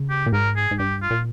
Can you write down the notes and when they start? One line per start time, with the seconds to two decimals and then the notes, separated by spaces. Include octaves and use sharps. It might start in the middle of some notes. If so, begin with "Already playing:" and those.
Already playing: C#3
0.10 G4
0.26 A#2
0.33 G#2 A#4
0.56 G#4
0.71 G#2
0.79 G2 G4
1.02 F4
1.11 A#2